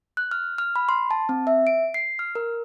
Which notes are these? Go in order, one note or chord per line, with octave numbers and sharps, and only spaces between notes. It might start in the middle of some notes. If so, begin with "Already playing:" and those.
F#6
F6
F6
B5
C6
A5
C4
E5
D7
C7
F6
A#4